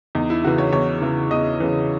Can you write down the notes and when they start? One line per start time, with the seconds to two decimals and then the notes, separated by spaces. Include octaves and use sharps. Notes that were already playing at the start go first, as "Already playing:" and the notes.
0.15 E2 D#4
0.30 E4
0.44 C#3 E3 F#4
0.58 C#5
0.73 E2 C#5
1.02 C#3 E3
1.31 E2 D#5
1.60 C#3 E3